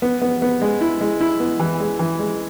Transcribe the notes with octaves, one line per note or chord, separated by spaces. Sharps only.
B3
B3
B3
G#3
E4
G#3
E4
B3
E3
G#3
E3
G#3